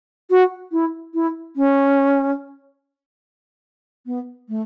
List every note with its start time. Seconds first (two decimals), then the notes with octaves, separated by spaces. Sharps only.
0.30 F#4
0.72 E4
1.14 E4
1.56 C#4
4.06 B3
4.49 A3